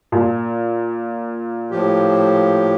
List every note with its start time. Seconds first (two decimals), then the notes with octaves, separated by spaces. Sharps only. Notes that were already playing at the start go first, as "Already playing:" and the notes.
0.12 A#2
1.71 A2 F3 G4